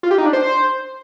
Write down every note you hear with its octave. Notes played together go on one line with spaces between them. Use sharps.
F4
G4
D#4
D4
C5